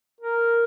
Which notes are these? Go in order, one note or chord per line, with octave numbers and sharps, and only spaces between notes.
A#4